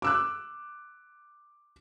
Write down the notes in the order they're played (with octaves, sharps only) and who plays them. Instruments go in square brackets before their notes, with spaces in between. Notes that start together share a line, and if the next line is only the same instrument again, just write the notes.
[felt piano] D6 E6 F#6